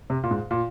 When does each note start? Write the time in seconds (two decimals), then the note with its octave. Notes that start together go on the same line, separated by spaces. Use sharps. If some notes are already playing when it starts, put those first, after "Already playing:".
0.10 C3
0.23 A#2
0.31 G#2
0.51 A#2